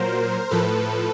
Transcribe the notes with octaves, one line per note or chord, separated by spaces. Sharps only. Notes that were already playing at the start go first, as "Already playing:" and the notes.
Already playing: A#2 F#3 A#4 C5
A2 F3 A4 B4